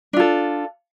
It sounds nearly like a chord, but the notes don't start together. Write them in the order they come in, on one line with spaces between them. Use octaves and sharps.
D4 F4 A4